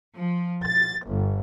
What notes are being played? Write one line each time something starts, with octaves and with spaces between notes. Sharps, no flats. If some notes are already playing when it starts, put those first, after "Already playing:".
F3
A6
G1